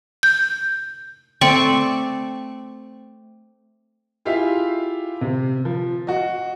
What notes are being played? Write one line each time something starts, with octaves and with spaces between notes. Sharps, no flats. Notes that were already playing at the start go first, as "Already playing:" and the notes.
G6
A3 C4 D5 C#6
E4 F4 G4 G#4 E5 F5
C3
F3
F#4 D#5